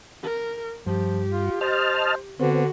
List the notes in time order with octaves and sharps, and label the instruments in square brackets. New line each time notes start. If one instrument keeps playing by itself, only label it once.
[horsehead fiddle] A#4
[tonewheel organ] G2 [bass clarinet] F3 [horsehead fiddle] G4
[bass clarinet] F4
[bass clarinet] C5 [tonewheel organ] D#5 A5 F6
[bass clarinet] D3 [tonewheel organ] B3 C4 [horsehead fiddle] F#4